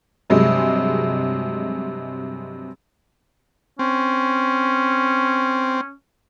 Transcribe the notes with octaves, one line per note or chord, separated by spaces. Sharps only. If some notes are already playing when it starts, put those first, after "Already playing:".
G2 C3 F#3 G#3
C4 C#4